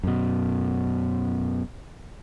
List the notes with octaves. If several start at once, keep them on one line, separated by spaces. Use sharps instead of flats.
F#2 B2